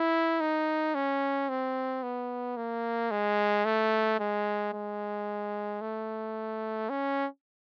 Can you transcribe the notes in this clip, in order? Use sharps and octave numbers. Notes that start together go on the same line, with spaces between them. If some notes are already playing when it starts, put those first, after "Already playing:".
Already playing: E4
D#4
C#4
C4
B3
A#3
G#3
A3
G#3
G#3
A3
C#4